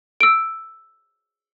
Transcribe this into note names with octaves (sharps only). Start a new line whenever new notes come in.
E6 D7